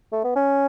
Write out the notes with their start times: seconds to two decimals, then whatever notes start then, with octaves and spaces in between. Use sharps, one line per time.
0.13 A3
0.24 B3
0.36 C#4